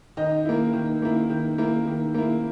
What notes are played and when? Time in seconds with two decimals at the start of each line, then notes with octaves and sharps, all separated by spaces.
0.17 D#3 D#5
0.45 A#3 E4
0.73 D#3
1.02 A#3 E4
1.30 D#3
1.58 A#3 E4
1.87 D#3
2.14 A#3 E4